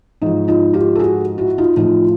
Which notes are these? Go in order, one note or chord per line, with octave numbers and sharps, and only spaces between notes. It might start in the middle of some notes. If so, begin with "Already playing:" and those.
G#2 F3 D#4
D#4 F4
F4 G4
A4
F#4 G#4
E4 F#4
D#4 F4
A2 F3 D#4 F4